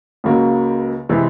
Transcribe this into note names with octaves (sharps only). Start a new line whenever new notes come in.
C#2 C#3 F#3 A#3
C3 E3 G#3